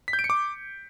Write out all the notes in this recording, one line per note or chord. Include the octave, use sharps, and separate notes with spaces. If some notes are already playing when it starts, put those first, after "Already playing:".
B6
G6
D7
C#7
D6